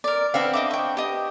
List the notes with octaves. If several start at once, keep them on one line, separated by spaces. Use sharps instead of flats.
A#4 D5
B3 C4 D4 E5 F5
D#5 E5 D6
G5 C#6
G4 D#5